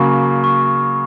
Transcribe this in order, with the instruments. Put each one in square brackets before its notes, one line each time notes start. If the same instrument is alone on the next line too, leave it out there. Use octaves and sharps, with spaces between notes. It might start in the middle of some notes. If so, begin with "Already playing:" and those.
Already playing: [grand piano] C#3 F#3 A#3 [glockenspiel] C#6
[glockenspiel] C#6